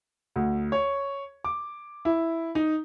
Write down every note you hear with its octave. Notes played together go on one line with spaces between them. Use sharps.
D2
C#5
D6
E4
D#4